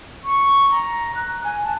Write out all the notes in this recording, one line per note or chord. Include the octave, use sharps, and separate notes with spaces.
C#6
A#5
F#6
G#5
A5